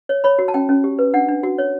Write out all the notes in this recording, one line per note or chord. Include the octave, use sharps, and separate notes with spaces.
C#5
C#5 B5
F#4
A5
C#4 G5
C#4
G4
B4
D4 F#5
D4
F#4
C#5